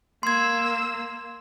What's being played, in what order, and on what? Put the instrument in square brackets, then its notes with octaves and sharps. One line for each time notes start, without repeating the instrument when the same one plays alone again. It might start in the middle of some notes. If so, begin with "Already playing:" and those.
[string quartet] A#3 E6 [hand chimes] C6 G#6